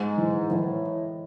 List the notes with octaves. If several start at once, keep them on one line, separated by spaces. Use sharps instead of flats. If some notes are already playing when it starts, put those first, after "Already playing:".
Already playing: G#2 G#3
E3
A#2
A2 E3